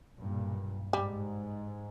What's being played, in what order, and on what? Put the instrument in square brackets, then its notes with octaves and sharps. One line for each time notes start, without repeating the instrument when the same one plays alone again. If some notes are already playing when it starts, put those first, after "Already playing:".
[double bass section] B1 G2 A#2
[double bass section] G#2 [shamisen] G3